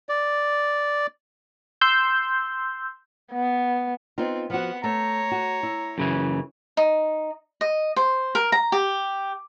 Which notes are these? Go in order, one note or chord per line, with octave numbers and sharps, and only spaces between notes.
D5
C6 E6 G6
B3
B3 C4 D#4 F4
F3 B3 F#4 F#5
A3 C#5 A#5
F#4
E4
F#2 C#3 E3
D#4
D#5
C5
A#4
A#5
G4